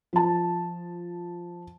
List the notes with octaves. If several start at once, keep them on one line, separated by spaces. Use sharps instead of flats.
F3 A5